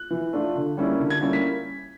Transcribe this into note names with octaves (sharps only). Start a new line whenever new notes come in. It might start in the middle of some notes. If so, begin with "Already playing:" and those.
Already playing: F#6
E3
A3 D4 F4
D3
G3 A#3 C#4 E4
D3
G#6
G3 A#3 C#4 E4
B6